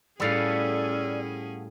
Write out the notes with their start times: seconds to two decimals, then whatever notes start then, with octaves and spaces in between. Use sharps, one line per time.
0.20 A2 G3 B3 C#4 G#4 A4 D5 F5